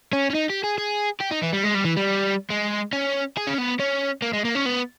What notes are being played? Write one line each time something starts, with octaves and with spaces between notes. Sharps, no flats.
C#4
C#4
D#4
G4
G#4
G#4
G4
D#4
E3
G3
G#3
G3
E3
G3
G#3
C#4
G#4
C#4
B3
C#4
A#3
G#3
A#3
C#4
B3